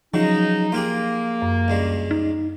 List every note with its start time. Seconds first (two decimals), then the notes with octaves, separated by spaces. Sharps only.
0.14 C#3 F3 F#3 G#3 D#4
0.72 A#3 F4 G4 G#4
1.42 F#2
1.68 C#2 G2 G#3
2.11 D#4